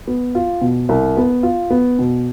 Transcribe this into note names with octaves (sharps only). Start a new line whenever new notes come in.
B3
F4
B2
C2
B3
F4
B3
B2